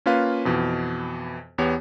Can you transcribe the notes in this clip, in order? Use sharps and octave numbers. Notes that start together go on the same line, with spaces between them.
A#3 C#4 F4 B4 F5
F2 B2 E3
E2 B3 G4 C#5